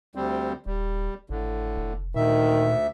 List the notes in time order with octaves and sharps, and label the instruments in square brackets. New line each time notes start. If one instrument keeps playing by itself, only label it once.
[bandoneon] D2 G3 C4
[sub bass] D#1 [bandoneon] G3
[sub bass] G#1 [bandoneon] A2 D3
[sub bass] F1
[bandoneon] D2 E5 [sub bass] A#2 [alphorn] D#3